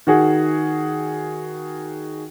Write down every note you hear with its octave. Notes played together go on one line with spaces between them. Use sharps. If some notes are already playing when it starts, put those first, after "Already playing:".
D#3 F#4 G#4